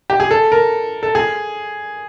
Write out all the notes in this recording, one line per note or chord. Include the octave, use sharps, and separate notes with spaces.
G4
G#4
A4
A#4
A4
G#4